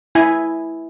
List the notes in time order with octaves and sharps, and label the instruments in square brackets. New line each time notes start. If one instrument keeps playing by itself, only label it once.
[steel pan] E4 G#5